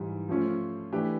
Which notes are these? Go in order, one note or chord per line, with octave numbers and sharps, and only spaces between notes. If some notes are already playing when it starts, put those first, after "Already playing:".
Already playing: G#2 E3 G3
F3 A3 C#4 F4
E3 A3 D4 G4 B4